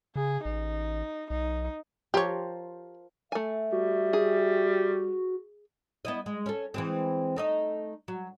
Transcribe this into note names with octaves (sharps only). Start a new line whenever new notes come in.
C#3 G#4
A1 D#4
B1 D#4
F3 G4 A#4 C5 C#5
A3 E5 G#5
G3 F#4
G#4
B3 E4 D#5
G#3
C#4 A4
E3 G#3 C4
A3 D#4 D#5
F#3